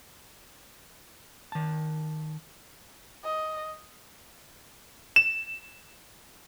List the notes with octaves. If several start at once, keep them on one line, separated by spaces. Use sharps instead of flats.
D#3 A5
D#5
E7